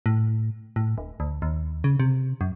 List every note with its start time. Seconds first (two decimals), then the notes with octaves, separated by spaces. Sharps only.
0.06 A2
0.76 A2
0.98 D1
1.20 D2
1.42 D#2
1.84 C#3
2.00 C3
2.41 F#2